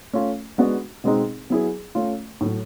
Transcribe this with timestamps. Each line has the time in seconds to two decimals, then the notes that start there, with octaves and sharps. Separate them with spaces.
0.13 A3 C#4 F4
0.58 G#3 B3 D4 F#4
1.04 B2 G#3 C4 D#4 G#4
1.50 F#3 B3 E4 G#4
1.95 A3 C#4 F4
2.41 A2 F#3 A3